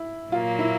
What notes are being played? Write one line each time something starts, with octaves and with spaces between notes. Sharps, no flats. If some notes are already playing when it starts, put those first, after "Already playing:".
Already playing: E4
A#2 F#3 A#3 F4
E4